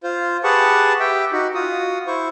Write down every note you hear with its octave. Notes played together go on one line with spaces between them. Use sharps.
F4 C5
G4 G#4 B4 F#5 A5 C#6
G4 E5 G5
D#4 F#4
F4 F#4 D#6
E4 C5 C#6